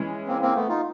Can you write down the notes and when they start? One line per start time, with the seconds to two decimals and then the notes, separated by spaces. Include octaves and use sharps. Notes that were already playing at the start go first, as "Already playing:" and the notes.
Already playing: E3 G#3 C#4
0.28 A#3 C4
0.42 A#3 C4
0.55 A3 B3
0.69 D#4 F4